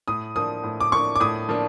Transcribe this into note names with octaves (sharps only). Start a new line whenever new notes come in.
A2 D#6
F3 A#3 D4 D#6
A2
D6
F3 A#3 D4 C#6
D6
A2 D#6
F3 A#3 D4